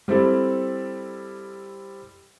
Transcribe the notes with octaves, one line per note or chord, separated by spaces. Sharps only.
G3 C4 E4 A4